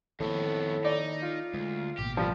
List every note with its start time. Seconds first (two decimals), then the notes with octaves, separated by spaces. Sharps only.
0.20 F2 A2 D#3 A#3 B3
0.85 D#4 D5
1.22 F4
1.54 D2 G#3
1.99 A1 B2 A#3 G4
2.17 D2 F3 G3